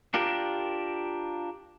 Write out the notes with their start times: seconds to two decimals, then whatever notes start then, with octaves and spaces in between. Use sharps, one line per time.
0.14 D4 F4 G4 A#4